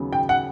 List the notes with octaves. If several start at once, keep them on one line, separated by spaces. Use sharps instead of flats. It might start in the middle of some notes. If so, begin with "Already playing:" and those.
Already playing: D#2 C#3 F#3 B3
G5
F#5